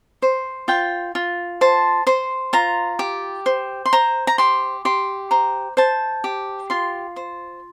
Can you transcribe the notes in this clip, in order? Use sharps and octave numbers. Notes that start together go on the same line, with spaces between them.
C5
F4 G5
F4
C5 A5
C5 C6
F4 A#5
G4
C5
C6
C5 A#5
A#5
G4 C6
G4 C6
C5 A#5
C5 A5
G4
F4 C6
C5